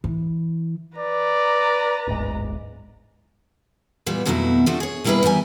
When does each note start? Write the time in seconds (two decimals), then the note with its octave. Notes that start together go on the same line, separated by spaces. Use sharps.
0.04 E3
0.98 B4 D5 A#5
2.07 D1 G1 G#2
4.06 A#2 E3 G3 B3
4.25 F2 B2 D#3 F#3 A3 E4
4.66 F3 G3 A3 C4 D4 F#4
4.80 G#4 C#5
5.04 B2 G3 A#3 E4 G#4 B4
5.23 D#3 E3 G3 G4 G#5